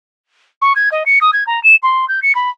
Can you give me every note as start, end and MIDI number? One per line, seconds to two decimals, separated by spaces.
0.62 0.73 85
0.76 0.89 92
0.92 1.03 75
1.06 1.19 97
1.21 1.31 87
1.33 1.44 92
1.47 1.62 82
1.64 1.76 100
1.83 2.06 84
2.08 2.20 91
2.23 2.35 97
2.35 2.50 83